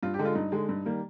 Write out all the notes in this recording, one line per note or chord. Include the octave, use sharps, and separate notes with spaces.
G2 F4
G4
D3 G#3
F4
G2 D#4
D3 G#3
G2
D#3 G3 A#3